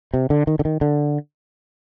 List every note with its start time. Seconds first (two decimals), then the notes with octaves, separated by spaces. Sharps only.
0.14 C3
0.30 D3
0.47 D#3
0.59 D3
0.65 D#3
0.81 D3